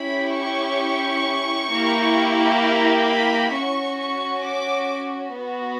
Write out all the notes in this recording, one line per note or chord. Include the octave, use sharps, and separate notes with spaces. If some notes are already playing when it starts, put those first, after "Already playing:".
Already playing: C#4 E4 G4 B5
C#6
A#3 E4 G4
B5
C#4 F#4 C#6
C#6
D6
B3 F#4